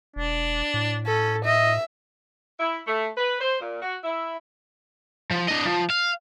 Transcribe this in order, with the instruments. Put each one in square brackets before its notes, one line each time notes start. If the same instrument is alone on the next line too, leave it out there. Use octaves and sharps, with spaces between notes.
[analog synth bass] E1 [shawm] D4
[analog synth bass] A2
[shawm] C#4 [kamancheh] A4
[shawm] D#5 [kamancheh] E5
[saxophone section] E4
A3
B4
C5
A#2
F#4
E4
[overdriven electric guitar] F3
D4 D#5
F3
F5